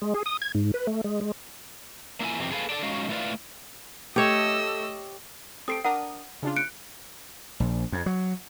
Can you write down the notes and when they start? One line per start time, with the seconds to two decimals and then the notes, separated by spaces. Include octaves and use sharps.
0.02 G#3
0.14 G#4
0.26 D#6
0.42 G#6
0.55 G#2
0.74 B4
0.87 A3
1.04 G#3
1.21 G#3
2.20 A#3 D4 E4 F4 G#5
2.39 F2 C3 E3 C4
2.52 G#4 A4 B4 F5
2.70 D4 A4 D5
2.83 G#3 C#4 D#4 F#4 F5
3.09 A3 E4 F4 B4 D5 F5
4.16 A3 G4 C#5 D#5 E6
5.68 C4 G4 A4 D#6 C7 D7
5.85 D4 A#4 F#5 D#6
6.43 C#3 D4 F4
6.56 F#6 C#7 D7
7.60 A#1
7.92 F2
8.06 F#3